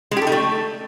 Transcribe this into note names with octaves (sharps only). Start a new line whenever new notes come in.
G#3
G4
A4
D#4
A3